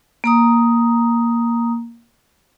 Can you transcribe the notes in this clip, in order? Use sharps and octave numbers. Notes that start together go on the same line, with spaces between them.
A#3 A#5 D#6